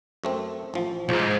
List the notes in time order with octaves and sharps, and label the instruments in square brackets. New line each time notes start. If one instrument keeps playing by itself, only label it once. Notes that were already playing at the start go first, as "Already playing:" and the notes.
[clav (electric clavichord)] F#2 A3 C4
A1 F3
[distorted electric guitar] B1 G#2 [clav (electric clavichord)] F3